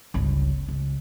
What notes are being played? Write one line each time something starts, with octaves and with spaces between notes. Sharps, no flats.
G1 C#2
C#2